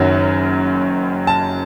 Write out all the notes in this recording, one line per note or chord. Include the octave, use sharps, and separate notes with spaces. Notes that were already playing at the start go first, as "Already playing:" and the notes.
Already playing: F#1 F#2 D#3 F#3
A5